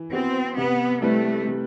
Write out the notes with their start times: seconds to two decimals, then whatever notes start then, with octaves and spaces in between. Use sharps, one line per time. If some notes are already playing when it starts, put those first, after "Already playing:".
Already playing: E3
0.13 B3 C4 F#4
0.57 C3 B3
1.02 G3 A3 C4 E4 B4
1.47 C3